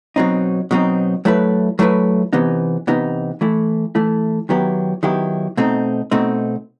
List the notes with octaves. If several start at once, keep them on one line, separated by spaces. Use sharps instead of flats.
B2 F#3 C4 D#4
B2 F#3 C4 D#4
F#3 A3 E4 B4
F#3 A3 E4 B4
C3 E3 B3 D#4
C3 E3 B3 D#4
E3 A3 E4
E3 A3 E4
D#3 F#3 B3 E4 G4
D#3 F#3 B3 E4 G4
B2 A3 C4 D#4
B2 A3 C4 D#4